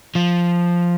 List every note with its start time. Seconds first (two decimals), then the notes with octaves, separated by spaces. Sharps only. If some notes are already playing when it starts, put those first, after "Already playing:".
0.15 F3